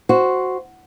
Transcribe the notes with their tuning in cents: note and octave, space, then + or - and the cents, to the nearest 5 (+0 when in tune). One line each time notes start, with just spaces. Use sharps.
F#4 +0 C5 +0